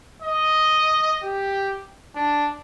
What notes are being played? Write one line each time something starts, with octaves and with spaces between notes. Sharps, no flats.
D#5
G4
D4